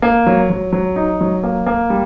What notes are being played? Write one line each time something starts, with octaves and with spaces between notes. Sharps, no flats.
A#3
F#3
F#3
F#3
D#4
F#3
A#3
A#3
G3